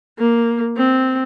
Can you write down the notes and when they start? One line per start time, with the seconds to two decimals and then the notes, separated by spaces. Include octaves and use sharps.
0.19 A#3
0.77 C4